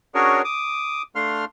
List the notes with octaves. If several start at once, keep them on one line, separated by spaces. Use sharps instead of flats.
C#4 D4 F#4 G#4 A#4 C#5
D6 D#6
A3 D4 F5 C6 F6